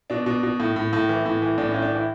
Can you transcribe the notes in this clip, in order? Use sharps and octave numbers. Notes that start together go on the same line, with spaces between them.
B2 D4
B2
B2
A2
A2
A2
E3
A2
E3
A2 D4
A2 C#4
D4
E3 E4